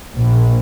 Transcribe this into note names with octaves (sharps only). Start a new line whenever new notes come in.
A#1